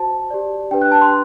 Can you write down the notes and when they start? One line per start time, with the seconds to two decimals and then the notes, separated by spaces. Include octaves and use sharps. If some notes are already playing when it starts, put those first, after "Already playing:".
Already playing: F#4 C5 A5
0.30 G4 D5
0.71 D4 G4 B4 G5
0.82 F#6
0.92 A5
1.01 C6